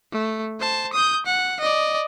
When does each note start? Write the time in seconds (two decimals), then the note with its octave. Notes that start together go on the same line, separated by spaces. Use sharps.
0.13 A3
0.60 C5 A5
0.93 D#6 G6
1.26 F#5
1.60 D5 D#5